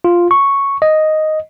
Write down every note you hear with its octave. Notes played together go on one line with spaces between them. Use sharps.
F4
C#6
D#5